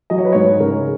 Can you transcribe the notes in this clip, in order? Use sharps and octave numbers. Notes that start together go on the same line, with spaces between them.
F#3 D#5
C#5
B4
G#2 C#5
C#3 A#4